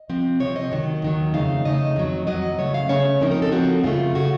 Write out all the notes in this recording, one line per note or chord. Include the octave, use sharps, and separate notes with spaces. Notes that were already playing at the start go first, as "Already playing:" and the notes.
Already playing: D#5
C3 F3 C4
C3 F3 C4 C#5
D#5
D#2 D#3 F#3 D#5
D#2 D#3 F#3
F2 C#3 A3 D#4 F5
F2 C#3 A3 D#4 D#5
F2 D#3 F#3
F2 D#3 F#3 D#5
C#3 A3 C#4 C#5
F5
C#3 A3 C#4 C#5
C#3 F3 C4 D#4 A#4
A#4
A4
C#3 F3 C4 D#4 F#4
F#2 C#3 A3 F4
C#3 A3 F#4